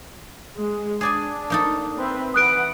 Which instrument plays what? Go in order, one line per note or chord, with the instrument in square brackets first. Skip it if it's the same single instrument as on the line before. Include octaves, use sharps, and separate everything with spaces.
[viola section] G#3
[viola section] D4 [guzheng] G#4 D5 G#5
[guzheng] A#3 D#4 A4
[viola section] C4 B4 E5
[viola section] E3 B4 F#5 [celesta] D#6 F#6 D7